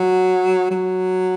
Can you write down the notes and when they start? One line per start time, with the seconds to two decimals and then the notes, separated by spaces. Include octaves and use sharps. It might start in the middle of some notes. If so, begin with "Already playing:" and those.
Already playing: F#3
0.71 F#3